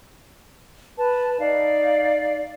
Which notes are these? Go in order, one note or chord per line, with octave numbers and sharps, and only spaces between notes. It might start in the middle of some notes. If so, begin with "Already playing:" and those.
B4 A5
D#4 D5 F5